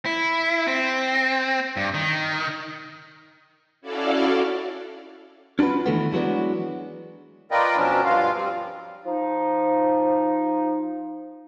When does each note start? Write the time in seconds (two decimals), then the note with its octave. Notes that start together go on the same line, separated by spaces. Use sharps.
0.06 E4
0.68 C4
1.77 G2
1.94 D#3
3.81 C#4 E4 F#4 A4 D5 F5
5.59 C#4 D4 F4 F#4 B4
5.86 D#3 E3 A3 B3
6.13 E3 F#3 G#3 B3 D4
7.51 F4 A#4 B4 D5 D#5 G5
7.77 B2 F3 F#3 C#4 D4
8.04 G2 F4 F5
8.35 F3 G3 C4
9.06 F3 D#4